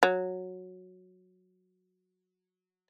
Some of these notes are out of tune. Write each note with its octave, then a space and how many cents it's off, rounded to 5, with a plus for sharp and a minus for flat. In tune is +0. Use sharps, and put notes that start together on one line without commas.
F#3 -10